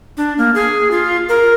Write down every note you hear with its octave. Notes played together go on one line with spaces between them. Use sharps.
D4
A#3
G#4
F4
A#4